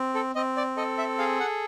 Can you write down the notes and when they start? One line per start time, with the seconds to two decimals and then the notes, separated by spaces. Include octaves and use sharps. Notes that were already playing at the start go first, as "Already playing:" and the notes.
Already playing: C4
0.15 A4
0.35 C4 D#5
0.57 D5
0.77 A4 D#5
0.98 E5
1.19 G#4 F5
1.40 F#5